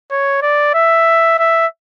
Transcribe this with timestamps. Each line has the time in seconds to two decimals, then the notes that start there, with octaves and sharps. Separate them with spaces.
0.11 C#5
0.42 D5
0.74 E5
1.39 E5